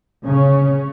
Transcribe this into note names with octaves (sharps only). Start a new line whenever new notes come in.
C#3 C#4